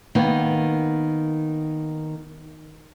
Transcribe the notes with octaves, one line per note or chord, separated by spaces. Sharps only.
D#3 A#3 B3